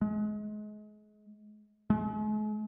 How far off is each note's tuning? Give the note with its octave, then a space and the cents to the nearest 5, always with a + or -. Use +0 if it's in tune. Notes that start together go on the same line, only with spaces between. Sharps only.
G#3 +30
G#3 +45